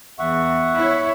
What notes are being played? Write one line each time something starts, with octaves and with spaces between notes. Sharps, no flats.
E2 E5 F#5 C#6
E4 C#5